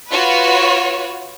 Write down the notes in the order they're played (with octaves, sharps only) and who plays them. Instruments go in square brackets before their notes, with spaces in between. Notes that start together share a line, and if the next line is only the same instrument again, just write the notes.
[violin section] F4 F#4 B4 C#5